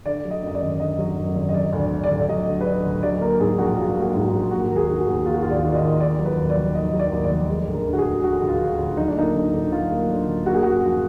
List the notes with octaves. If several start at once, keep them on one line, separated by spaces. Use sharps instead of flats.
D3 D5
F#3
D#5
F#2 D#5
D5
G#1
D3 D#5
F#3
F#2
G#1
D#5
F#3 D5
D2
D5
D3
D5
D2
D5
F#3 D#5
D2
B4
D3 D5
D2
F#3 D5
A#3 A#4
G#2 G#4
A#1 F#4
F#3 F4
A#3
F#4
G#2
F#4
A#1
A#3 F#4
D#2 A#4
G#4
D#3
F#4
D#2
A#3 F4
F#4
D#2 F4
D5
D#3
D5
D#5
D#2
D#3 D5
F#3
B4
D#2
D5
F1
D#3 D#5
F#3
D5
D#2
D5
F1
G#3
D2
A#4
D3
F#4
G#4
D2
G#3 F#4
D2
F4
D3
D2
F#3 D#4
D4
A#3 D#4
D3
D2
F#3 F4
A#3
D3
D2
A#3 F#4
G#4
F#2 F#4
F3